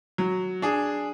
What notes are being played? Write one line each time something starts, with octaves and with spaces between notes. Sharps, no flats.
F#3
D4 G#4